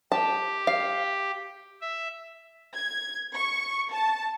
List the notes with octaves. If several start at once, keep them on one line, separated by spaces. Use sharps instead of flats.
G4 A5
F5
E5
G#6
C#6
A5